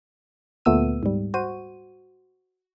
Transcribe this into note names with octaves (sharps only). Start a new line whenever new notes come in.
D2 A#2 A3 B3 E6 D#7
G#2 G3
F#4 C5 D#7